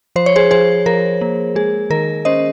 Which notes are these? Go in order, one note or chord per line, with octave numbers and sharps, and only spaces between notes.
F3 C5
C#5
G#4 C5
F3 G#4 C5
F3 A#4
A#3
G#3 G#4
D#3 A#4
C#4 C5 D#5